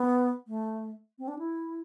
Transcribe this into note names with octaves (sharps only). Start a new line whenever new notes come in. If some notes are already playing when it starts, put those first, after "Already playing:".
Already playing: B3
A3
C4
D4
E4